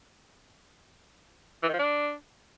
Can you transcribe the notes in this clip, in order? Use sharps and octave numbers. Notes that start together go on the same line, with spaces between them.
E3
D#3
F3
D4